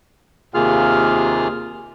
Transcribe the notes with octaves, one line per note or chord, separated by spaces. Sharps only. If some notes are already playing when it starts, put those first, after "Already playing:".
D#2 C3 A#3 F4 G#4 F6